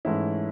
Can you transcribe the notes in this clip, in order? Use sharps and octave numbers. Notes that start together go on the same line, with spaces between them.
G#2 E3 A3 C#4 E4